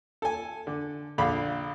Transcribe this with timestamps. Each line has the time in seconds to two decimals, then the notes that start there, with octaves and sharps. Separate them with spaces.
0.22 A4 G#5
0.67 D3
1.18 A#1 D3 D4 F5 B5